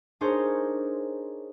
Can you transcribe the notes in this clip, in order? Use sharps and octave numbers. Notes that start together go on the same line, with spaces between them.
D4 D#4 G#4 A#4 C5 C#5